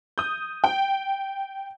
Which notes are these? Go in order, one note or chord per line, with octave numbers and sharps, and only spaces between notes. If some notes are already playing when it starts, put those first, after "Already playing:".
D#6 G6
G5